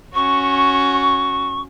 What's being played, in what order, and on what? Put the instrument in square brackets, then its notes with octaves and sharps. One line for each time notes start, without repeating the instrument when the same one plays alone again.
[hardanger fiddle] C#4 F#4 [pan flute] C#6